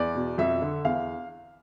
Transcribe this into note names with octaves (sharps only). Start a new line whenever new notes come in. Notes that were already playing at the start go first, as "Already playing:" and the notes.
Already playing: E2 D5
B2
F2 E5
D3
E2 F5